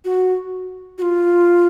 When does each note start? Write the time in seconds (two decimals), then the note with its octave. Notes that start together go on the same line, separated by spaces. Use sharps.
0.05 F#4
0.98 F#4
1.02 F4